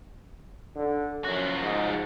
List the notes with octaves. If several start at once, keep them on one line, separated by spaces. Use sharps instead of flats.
D3
F#2 F3 F#4
G#2